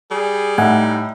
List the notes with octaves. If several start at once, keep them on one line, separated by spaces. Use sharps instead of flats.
G3 G#4
A2 D#4 F#5 G#5